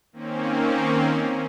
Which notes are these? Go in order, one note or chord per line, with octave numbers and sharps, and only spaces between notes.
D#3 A#3 C4 C#4